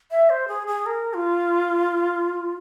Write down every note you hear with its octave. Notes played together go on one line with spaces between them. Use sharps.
E5
C5
G#4
G#4
A#4
F4